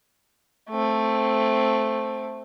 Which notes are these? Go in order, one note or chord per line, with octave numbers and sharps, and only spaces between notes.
A3 C4